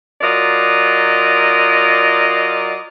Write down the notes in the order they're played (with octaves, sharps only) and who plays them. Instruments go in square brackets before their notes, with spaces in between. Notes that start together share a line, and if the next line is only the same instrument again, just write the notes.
[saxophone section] F#3 F4 A#4 D5 D#5